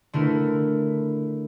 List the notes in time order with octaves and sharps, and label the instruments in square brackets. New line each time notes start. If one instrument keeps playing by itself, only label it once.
[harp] D3 A3 E4 A#4